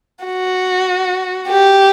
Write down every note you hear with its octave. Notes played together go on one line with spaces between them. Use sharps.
F#4
G4